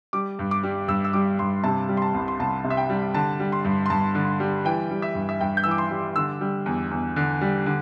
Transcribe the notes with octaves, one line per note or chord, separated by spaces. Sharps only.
G3 D6
G2
D6
G3
G2 E6
E6
G3 D6
G2 C6
C3 A5
G3
C6
A5
C2
C6
C2 A5
C3
E5
G5
G3
D3 A5
G3
C6
G2
C6
G2 A5
D3
G3
E3 G5
G3
E5
G2
E5
G2 G5
G6
E3 E6
D6
C6
G3
D3 E6
G3
E2
E2
D3
G3
D3